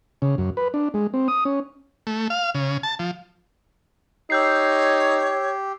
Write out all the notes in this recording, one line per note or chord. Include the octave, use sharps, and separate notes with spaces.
C#3
F#2
B4
D4
G#3
C4
D#6
C#4
A3
F5
C#3
A5
F3
D#4 G4 C#5 E6 G6 C7